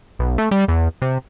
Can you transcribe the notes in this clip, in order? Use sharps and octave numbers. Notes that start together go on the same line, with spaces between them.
B1
A3
G3
E2
C3